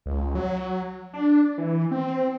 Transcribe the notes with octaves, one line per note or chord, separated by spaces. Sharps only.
C#2
F#3
D4
E3
C4